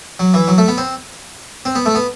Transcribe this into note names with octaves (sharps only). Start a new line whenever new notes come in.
F#3
E3
F#3
A3
B3
C4
C4
B3
A3
B3